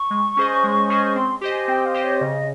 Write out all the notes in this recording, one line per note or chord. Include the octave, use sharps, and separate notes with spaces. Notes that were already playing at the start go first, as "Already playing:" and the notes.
Already playing: C#6
G#3
C#4 G#4 C5 D#5
G#3
C#4 G#4 C5 D#5
C4 C6
G4 C5 D#5
G#5
C4 G5
F5
G4 C5 D#5
C#5
C#3 D#5